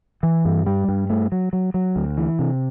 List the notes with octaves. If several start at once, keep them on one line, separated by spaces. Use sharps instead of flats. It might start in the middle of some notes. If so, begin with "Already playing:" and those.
E3
G2
G3
G2
A3
F#3
F#3
F#3
D2
E3
C3